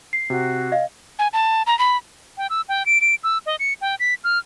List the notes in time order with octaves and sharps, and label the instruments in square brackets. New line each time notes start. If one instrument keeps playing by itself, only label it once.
[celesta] C7
[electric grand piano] C3 [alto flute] F#4
[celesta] D#5 F5
[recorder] G#5
A5
A#5
B5
[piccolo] G5
E6
G5
D7
D7
E6
D#5
C#7
G5
B6
F6